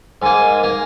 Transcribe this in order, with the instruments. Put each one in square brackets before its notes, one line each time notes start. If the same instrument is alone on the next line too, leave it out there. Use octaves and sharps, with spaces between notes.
[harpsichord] G#2 A#3 [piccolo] G#5
[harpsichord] A#3